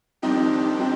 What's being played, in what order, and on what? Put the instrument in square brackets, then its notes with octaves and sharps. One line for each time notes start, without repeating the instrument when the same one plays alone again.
[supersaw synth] F2 D#3 G3 D4 G4 [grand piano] C4 D#4
[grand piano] C4 D#4